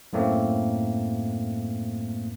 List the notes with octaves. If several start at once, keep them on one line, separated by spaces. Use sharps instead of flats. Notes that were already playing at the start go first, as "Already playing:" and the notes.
F#2 A2 A3 A#3 C4